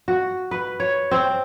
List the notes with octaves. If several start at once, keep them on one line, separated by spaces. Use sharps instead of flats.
F#4
B4
C#5
C4